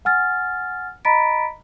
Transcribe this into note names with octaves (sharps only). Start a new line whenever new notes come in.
F#5 G#5 F6 A6
D#5 A#5 B5 A6 B6 D7